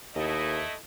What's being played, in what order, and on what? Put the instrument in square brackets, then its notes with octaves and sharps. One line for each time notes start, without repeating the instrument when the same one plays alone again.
[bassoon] D#2 [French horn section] A3 E4 D#5